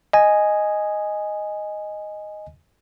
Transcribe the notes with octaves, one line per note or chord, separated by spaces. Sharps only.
D#5 G#5